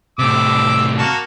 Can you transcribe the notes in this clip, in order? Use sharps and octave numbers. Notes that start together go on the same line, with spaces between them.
A2 C3 D6 E6
A#3 F#4 A5